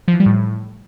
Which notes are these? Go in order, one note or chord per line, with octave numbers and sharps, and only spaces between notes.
F3
E3
G3
A2